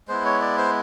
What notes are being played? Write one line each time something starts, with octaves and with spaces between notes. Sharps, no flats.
G#3 B3 E4 C5
C#5
D5
C5